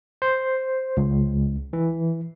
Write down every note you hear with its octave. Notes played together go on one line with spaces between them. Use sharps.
C5
C#2
E3